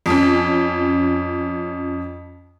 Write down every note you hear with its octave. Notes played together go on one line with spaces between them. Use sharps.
F2 C#4